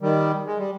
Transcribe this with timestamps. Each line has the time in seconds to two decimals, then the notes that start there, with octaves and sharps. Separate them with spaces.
0.02 D#3 G3
0.45 G#3
0.58 G3